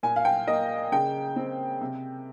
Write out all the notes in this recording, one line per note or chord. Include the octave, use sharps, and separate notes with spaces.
A#2 G#5
F5
G5
A#3 D#5
C#3 G5
C4
C3